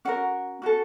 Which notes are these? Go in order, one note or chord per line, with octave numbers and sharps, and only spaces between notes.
C#4 F#4 A#4 F#5
C#4 F#4 A4